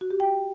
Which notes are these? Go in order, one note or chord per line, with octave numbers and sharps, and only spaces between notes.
F#4
G4
G5